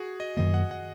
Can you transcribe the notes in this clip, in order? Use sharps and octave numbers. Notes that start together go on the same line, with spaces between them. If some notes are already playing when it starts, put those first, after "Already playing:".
Already playing: F#4 G#4
D#5
F#2 D#3 A#3 D#5
F#5
F#5